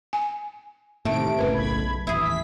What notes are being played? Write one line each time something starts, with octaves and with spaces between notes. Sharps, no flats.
G#5
A2 C3 D#3 A3 E5 D7
F#1 A2 C#3 A#4 B4
B1 B5 G#6
D#1 A1 E4 G#4 E5
B6